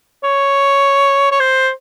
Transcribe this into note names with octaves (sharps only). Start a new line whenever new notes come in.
C#5
C#5
C5